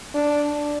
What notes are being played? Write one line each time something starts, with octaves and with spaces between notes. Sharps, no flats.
D4